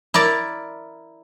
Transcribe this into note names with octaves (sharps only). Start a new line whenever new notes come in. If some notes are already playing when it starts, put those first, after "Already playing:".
E4 A#4 D5